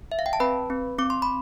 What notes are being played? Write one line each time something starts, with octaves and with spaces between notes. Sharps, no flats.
E5
F5
G5
A5
C4 B4 B5
C4
C4 D6
C6
B5